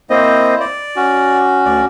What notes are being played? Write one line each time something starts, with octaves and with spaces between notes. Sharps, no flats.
A#3 C4 E4 C5 D#5
D5
C#4 F#4
D2 D5